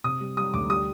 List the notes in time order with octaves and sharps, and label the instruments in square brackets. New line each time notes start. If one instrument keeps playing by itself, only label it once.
[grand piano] C3 [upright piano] D#6
[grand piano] G3
[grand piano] G3 [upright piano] D#6
[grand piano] D2 [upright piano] D6
[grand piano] G3 [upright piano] D#6